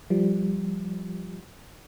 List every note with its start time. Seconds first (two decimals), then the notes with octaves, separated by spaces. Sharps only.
0.10 F3 G3